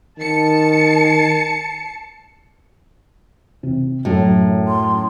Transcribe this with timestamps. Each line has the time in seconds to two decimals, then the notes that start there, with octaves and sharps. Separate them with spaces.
0.18 D#3 A5 C#7
3.63 C3
4.05 F#2 A2
4.67 C6